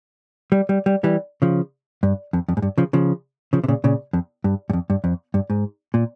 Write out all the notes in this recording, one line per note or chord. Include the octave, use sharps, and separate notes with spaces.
G3
G3
G3
E3 G3
C#3 F3
G2
F2
F2
G#2
G2
C#3 F3
C#3 F3
C#3 F3
C3
A#2 C#3
A#2 C#3
F2
G2
G2
F2
G2
F2
G2
G#2
A#2